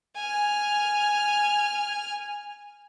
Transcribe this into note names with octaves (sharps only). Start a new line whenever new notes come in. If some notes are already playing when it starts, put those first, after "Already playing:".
G#5 F6